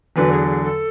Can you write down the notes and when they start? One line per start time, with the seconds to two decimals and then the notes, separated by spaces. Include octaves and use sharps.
0.16 E2 D3 F#3 B4
0.32 G#4
0.48 G#4
0.63 A4